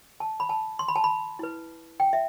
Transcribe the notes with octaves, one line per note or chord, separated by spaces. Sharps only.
A5
B5
A5
C6
B5
A5
B5
E4 B4
G5
E5